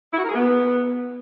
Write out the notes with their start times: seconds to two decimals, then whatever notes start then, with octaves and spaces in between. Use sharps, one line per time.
0.13 E4
0.18 F#4
0.23 A#4
0.29 G#4
0.34 B3